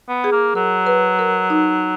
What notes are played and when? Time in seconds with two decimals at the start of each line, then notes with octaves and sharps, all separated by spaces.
0.08 B3
0.24 G#4
0.32 A#3
0.55 F#3 A#4
0.87 B4
1.19 A#4
1.50 D#4